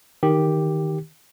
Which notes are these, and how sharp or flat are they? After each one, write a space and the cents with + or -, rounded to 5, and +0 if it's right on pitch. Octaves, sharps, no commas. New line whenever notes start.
D#3 +0 G4 +0